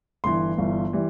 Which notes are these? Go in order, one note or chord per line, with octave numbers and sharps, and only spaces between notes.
G1 G2 E3 C6
G1 G2 E3
E3 G3